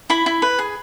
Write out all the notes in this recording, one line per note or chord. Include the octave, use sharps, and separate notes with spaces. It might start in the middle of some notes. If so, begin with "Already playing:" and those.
E4 B5
E4
B4
G#4